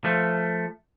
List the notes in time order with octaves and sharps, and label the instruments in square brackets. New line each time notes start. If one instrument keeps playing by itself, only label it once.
[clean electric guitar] F3 A3